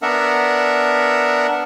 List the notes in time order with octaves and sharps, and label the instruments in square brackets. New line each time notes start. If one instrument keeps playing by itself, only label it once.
[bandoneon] B3 D4 A#4 E5 F#5